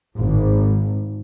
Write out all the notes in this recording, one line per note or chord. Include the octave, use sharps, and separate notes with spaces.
G#1